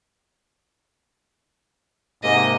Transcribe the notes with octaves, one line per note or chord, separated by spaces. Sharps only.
G#2 C3 G#3 A#3 D#5